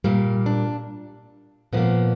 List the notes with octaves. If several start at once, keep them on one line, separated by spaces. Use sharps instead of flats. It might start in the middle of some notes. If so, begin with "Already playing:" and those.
A#2 G3 A#3
D4
A#2 F3 A#3 B3